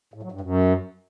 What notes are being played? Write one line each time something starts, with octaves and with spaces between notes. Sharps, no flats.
A2
F#3
G2
F#2